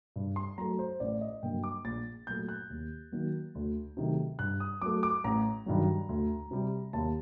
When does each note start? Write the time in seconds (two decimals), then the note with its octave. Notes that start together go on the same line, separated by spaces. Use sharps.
0.16 G2
0.36 C6
0.58 F#3 A3 A#5
0.79 C5
1.00 A1 D5
1.21 D#5
1.43 G2 D3 F#3 A#3 G5
1.64 D6
1.85 A#1 A6
2.27 A#2 F#3 A3 G6
2.49 F#6
2.70 D#2
3.12 D#3 F#3 A#3
3.55 D2
3.97 C3 D#3 F#3 A3
4.39 G2 F#6
4.60 D#6
4.82 F#3 A3 D6
5.03 D6
5.24 A1 A#5
5.66 G2 D#3 F#3
6.09 D2
6.51 C3 G3
6.93 D#2 A5